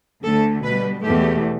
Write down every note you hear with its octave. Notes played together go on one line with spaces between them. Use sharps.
D2 D3 A3 A4
B2 G3 B4
E2 B2 A3 G4